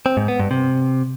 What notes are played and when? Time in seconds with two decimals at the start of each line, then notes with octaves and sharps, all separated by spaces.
0.06 C4
0.17 G#2
0.28 B3
0.39 G2
0.51 C3